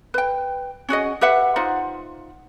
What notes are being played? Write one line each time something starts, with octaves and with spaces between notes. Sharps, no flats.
B4 G5
C#4 F#4 G#4 D#5
G4 B4 E5 F#5
D#4 F4 C5 F#5